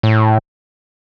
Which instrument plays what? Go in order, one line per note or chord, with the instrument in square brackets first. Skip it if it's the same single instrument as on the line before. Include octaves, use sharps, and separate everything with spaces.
[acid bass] A2